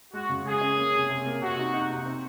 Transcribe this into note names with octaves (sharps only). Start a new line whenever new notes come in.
G#3 F#4
C#3
G#3 G#4
C#4
A#3
C3
C3
A#3
C3 F#4
D#4
D#4
C3
C4